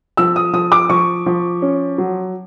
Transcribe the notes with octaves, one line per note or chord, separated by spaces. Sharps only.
F3 E6
D#6
F3 D#6
D6
F3 C#6
F3
C#4
F#3